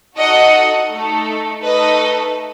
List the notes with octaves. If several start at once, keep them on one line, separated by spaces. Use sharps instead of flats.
D#4 F#4 A4 D#5 F#5
A3 D#4 A4
A3 D#4 A4 B4 D#5